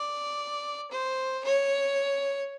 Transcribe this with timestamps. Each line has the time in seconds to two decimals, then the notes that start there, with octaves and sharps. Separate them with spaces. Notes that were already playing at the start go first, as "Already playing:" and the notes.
Already playing: D5
0.91 C5
1.45 C#5